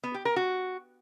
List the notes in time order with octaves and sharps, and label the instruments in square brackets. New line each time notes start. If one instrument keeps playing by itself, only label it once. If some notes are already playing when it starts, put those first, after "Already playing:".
[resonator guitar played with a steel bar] B3
G4
A#4
F#4